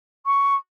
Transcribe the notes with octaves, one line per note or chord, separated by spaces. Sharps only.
C#6